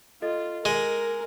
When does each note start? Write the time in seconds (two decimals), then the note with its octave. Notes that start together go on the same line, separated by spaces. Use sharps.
0.22 F4 A4 D#5 A6
0.65 G#3 A#4